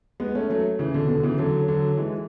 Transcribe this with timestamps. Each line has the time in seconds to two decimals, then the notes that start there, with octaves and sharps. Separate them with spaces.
0.20 G#3 B3
0.35 A3 C#4
0.50 F#3 A3
0.79 C#3 E3
0.94 B2 D3
1.09 B2 D3
1.23 C#3 E3
1.38 D3 F#3
1.68 D3 F#3
1.98 E3 G#3